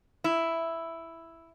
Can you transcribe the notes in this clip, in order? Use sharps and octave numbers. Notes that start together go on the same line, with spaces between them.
E4